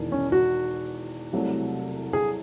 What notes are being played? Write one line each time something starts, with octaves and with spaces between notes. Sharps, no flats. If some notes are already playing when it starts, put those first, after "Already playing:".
Already playing: E1 E2 D#3
C#4
F#4
C2 C3 F#3 A3
G#4